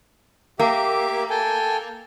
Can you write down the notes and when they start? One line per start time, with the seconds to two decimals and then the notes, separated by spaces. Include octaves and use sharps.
0.59 A#3 G4 E5 D6
1.30 A4 G5 G#5